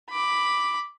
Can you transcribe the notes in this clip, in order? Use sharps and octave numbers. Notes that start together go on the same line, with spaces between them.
B5 D6